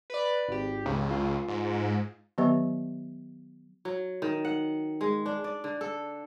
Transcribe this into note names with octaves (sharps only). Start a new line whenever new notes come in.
B4 D5
G#1 G4
C#2
F4
G#2
D#3 F#3 B3 G4 B4 E5
F#3
D#3
F#5
G#3
D4
D5
D3
A4